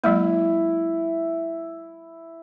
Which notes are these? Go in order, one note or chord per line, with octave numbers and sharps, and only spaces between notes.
F#3 G#3 A#3 E4